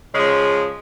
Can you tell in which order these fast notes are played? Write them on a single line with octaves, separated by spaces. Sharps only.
C#3 G#3 F3